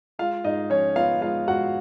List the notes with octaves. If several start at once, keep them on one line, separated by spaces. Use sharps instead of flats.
G#3 F4 F5
G#2 D#4 D#5
F3 C#4 C#5
B3 F4 F5
G#3 F4 F5
G#2 F#4 F#5